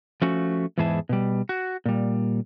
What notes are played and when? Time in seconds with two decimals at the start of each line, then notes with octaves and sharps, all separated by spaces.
0.22 F3 A3 C#4 F#4
0.78 E2 G#2 E3 E4 G#4 A5
1.09 B2 G3
1.49 F#4
1.86 A#2 G3